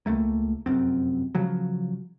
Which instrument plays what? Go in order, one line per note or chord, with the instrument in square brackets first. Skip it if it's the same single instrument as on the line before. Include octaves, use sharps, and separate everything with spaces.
[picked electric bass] C#2 F#2 A3 A#3
F1 F#2 C4
C#3 F3 F#3